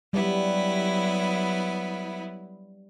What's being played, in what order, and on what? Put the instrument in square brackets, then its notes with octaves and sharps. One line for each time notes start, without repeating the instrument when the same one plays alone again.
[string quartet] F#3 B3 E4 [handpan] G3